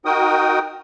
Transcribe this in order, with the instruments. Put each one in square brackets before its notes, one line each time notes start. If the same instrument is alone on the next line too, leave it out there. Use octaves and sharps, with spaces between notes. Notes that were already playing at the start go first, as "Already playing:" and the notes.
[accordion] D#4 F#4 A#4 G5 D#6